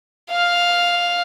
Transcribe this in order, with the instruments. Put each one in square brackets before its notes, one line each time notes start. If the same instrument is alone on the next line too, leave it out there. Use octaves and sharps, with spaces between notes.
[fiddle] F5 F6